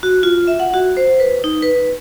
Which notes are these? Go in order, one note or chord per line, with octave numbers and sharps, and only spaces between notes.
F#4
F4
E5
F#5
F#4
C5
B4
D#4
B4